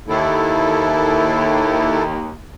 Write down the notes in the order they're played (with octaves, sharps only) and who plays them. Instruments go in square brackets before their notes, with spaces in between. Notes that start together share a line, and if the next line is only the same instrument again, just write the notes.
[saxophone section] D#2 [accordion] E4 A4